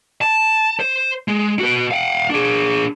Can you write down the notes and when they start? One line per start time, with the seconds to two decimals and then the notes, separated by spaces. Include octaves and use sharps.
0.21 A5
0.80 C5
1.28 G#3
1.59 F#4 B4
1.91 F5 F#5
2.30 D4 G#4